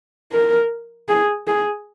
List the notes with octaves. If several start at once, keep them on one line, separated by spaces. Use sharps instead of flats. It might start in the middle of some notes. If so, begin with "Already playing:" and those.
A#4
G#4
G#4